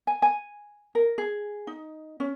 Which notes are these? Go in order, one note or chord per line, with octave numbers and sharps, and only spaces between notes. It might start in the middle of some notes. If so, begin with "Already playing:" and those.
G#5
G#5
A#4
G#4
D#4
C#4